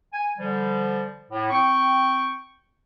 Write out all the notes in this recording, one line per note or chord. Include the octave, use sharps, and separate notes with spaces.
G#5
D3 F3 G3
A2
C4 G5 C#6